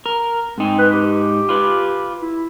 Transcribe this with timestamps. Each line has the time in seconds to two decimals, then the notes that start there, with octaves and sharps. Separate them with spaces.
0.06 A#4
0.58 G#2 C4 D#4
0.78 B4
0.93 G4
1.49 F4 B4
2.22 E4